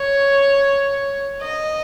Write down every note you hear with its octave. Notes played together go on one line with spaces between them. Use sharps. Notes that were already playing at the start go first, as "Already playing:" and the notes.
Already playing: C#5
D#5